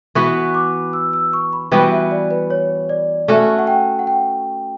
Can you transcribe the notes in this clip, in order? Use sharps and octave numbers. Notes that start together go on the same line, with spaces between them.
E3 B3 F#4 B4 C#6
D6
E6
E6
C#6
B5
E3 G3 B3 F#4 G5
E5
D5
B4
C#5
D5
A3 C#4 F#4 E5
F#5
G5
F#5
G5